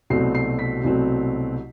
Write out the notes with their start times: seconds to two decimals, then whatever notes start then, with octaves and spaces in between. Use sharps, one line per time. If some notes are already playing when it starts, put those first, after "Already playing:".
0.10 C2 B2 F#3 A3 C4 C7
0.35 C7
0.59 B6
0.84 C2 B2 F#3 A3 C4